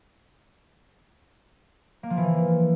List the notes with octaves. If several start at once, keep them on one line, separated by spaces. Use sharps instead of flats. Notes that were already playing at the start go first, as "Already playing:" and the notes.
A#3
F3
E3